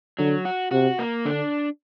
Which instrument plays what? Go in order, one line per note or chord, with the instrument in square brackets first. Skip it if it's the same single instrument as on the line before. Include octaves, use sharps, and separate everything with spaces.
[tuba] D3 [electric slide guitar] F#3
[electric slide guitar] F#4
[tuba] C3 [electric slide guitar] F#4
[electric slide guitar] A#3
[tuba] D3 [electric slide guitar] D4